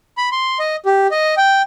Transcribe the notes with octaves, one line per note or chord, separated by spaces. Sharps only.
B5
C6
D#5
G4
D#5
G5